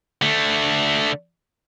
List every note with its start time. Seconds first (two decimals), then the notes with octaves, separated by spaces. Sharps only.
0.22 D3 A3